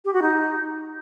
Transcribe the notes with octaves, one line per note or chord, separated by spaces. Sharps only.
G4
F#4
D#4